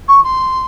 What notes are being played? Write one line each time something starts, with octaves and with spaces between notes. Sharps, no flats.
C#6
C6